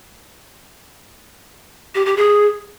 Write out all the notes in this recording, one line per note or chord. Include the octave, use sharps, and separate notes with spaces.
G4
G4
G#4